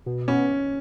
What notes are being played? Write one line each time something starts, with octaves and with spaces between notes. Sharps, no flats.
B2
B3 C#4